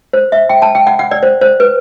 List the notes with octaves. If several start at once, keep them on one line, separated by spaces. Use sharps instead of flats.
C5
E5
G5
A5
G5
F#5
F#5
D5
C5
C5
B4